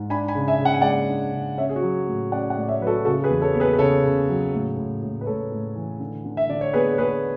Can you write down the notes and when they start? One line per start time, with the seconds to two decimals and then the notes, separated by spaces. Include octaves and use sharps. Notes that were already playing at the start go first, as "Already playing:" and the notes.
Already playing: G#2
0.10 D4 G#5 B5
0.28 G#5 B5
0.35 C#3
0.48 E5 G#5
0.60 C#3
0.65 F#5
0.74 G#5
0.81 G#3 D5 F#5
1.09 D4
1.33 C#3
1.58 C#4 C#5 E5
1.69 G#4
1.76 F#4
1.83 F#3
2.07 A2
2.32 C#4 D5 F#5
2.50 D5 F#5
2.56 A2
2.63 D5
2.68 C#5 E5
2.80 F#3 B4
2.87 F#4 A4
3.05 C#3 F#4 A4
3.24 G#4 B4
3.30 E2
3.42 A4 C#5
3.54 B3
3.60 G#4 B4
3.73 B4
3.79 C#3 A4 C#5
4.03 C#3
4.29 F#3
4.53 A2
4.77 A2
5.02 A2
5.21 B4
5.26 A2 A4 C#5
5.52 A2
5.76 E3
6.00 D3
6.25 D3
6.37 E5
6.49 D3 D5
6.61 C#5
6.73 B3 G#4 B4
6.94 C#5
6.98 B3 G#4 B4